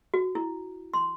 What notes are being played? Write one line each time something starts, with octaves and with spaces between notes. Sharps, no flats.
F#4
E4
C6